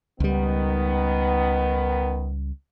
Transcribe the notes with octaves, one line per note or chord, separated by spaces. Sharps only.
C#2 D#3 G3 B3